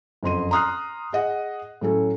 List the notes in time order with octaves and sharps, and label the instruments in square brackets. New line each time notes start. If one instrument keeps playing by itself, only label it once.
[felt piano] F#1 F2 C6 D#7
A#5 C6 D#6 F6 F#6 C7
G#4 D#5 F#5
A2 F#3 C#4 A4